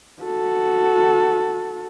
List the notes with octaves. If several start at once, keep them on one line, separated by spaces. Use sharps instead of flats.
F#4 A4